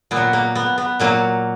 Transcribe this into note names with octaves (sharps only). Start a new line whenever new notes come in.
A#2 B3
F#3
A#3
B3
B3
A#2 F#3 A#3